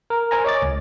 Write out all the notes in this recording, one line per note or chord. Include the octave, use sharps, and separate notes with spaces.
A#4
A#4 C5 G#5 A#5
C#5 D#5 D6 A6
C#2